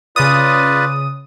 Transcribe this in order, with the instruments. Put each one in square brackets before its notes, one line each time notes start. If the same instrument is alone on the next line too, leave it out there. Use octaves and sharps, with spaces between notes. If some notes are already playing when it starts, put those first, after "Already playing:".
[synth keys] C#3 D#6 [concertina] F4 B4 D5